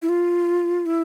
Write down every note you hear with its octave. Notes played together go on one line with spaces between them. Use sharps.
E4
F4
E4